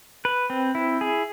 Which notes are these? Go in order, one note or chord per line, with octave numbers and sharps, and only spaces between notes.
B4
C4
E4
G#4